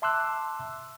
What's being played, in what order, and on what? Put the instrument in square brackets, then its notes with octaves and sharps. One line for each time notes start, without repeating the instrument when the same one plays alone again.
[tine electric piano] E5 A5 C6 D6 E6 F#6